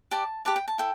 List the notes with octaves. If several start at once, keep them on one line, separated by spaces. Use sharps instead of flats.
G4 B4 D5 A5
G4 B4 D5 A5
G5
A5
E4 A4 G5